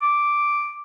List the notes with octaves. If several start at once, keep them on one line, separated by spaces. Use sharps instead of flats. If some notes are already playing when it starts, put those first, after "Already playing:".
D6